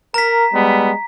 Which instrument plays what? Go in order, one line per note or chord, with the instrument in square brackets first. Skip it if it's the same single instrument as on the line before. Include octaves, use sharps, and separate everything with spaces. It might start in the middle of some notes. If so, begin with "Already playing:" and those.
[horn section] A#4 [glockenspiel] A#5 B6
[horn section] G3 G#3 B3